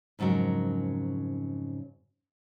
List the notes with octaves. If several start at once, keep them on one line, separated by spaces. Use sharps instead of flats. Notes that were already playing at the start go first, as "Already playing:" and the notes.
F2 G#2 C#3 F#3 A#4